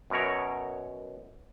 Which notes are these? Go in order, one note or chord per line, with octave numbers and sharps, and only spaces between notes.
F#2 B2 A#4 C#5